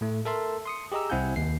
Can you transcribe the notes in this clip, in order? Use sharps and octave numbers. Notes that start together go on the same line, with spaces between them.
A2 A3
A4 A#4 E5 A5 C6
C6 D#6 C#7
G4 G#4 D#5 A#5 E6
C2 C4 E4 F#5 G#5 G6
D#2 C7